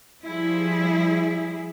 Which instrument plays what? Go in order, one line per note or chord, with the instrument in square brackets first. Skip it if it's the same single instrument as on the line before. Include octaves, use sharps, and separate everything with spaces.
[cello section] F3 G3 E4 G#4